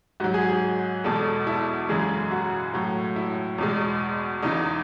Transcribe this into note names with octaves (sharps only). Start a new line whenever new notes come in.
G#2 F#3 F#4
G#4
G#4
E2 B2 G#3 A4
E4
F#2 C#3 E3 G#3 G#4
F#4
A2 F#3
E4
E2 B2 G#3
E2 C#3 E3 D#4